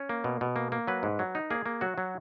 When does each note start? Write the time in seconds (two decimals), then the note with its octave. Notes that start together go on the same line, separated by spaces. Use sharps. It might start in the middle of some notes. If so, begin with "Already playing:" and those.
Already playing: C#4
0.09 A#3
0.24 B2
0.41 B2
0.56 A#3
0.72 A#3
0.87 F#3 B4
1.03 G#2
1.19 F#3
1.35 D#4
1.50 A#3 G#4
1.66 A#3
1.81 F#3 F#4
1.98 F#3